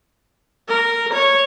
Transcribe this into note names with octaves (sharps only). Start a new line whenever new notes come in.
A#4
C#5